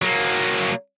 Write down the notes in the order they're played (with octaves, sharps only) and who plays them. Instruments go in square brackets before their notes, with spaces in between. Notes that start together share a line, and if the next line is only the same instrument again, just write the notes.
[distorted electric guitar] F#3 A#3